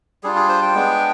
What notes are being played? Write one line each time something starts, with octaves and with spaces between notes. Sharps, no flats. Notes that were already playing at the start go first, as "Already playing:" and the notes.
G3 D4 F4 G#4
G#4
C5
G5
G#3 B3 D4